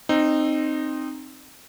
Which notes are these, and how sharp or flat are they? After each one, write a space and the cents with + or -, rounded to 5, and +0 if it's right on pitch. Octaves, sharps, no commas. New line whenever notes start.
C4 +10 D#4 -15